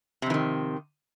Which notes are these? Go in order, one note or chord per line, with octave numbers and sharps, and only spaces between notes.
F2 C3 D#3 E3